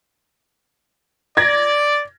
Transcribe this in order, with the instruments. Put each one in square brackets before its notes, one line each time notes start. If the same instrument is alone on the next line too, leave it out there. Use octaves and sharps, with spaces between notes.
[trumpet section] D5 [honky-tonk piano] G#6 A#6